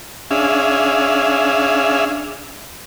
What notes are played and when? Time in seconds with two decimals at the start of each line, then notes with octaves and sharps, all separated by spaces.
0.31 C#4 D4 G#4 E5 F5